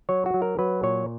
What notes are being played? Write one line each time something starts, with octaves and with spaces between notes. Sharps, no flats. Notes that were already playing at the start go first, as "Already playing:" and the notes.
F#3 C#5
F#4
F#3
A#4
F#3 B4
A#2 C#5